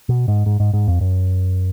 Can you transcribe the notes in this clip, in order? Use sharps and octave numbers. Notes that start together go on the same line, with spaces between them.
B2
G#2
G#2
G#2
G#2
F2
F#2